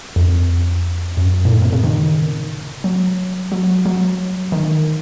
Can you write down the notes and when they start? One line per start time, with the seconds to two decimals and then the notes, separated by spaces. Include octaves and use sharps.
0.16 F2
1.17 F#2
1.45 A#2
1.51 A2
1.62 C3
1.72 C#3
1.84 D#3
2.84 F#3
3.52 F#3
3.86 F#3
4.52 D#3